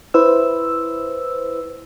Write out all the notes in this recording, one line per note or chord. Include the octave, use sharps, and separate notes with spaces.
E4 B4 C5 E6